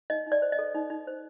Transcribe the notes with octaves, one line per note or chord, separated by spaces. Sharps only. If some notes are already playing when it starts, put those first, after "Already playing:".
D#4 D#5
D#4
D5
C5
D#5
A4
D#4
D#4
C5